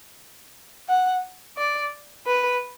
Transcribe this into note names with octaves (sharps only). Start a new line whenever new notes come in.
F#5
D5
B4